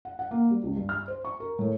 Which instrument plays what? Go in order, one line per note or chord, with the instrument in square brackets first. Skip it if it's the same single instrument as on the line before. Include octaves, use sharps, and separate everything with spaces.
[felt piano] F#5
F#5
A#3
G3
C#2
G2
F6
C5
C#6
A#4
A2